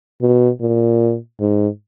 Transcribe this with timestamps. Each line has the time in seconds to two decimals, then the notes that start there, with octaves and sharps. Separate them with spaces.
0.22 B2
0.61 A#2
1.40 G#2